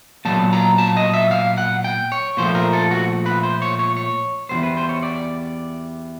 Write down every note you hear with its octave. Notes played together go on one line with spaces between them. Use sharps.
A#2 F#3 B3 A5
A#5
A5
D#5
E5
F5
F#5
G5
C#5
A#2 F3 A3 C5
A#4
A4
F#4
B4
C5
C#5
C#5
C#5
E2 B2 G3 B3 C5
B4
C5
C#5
D5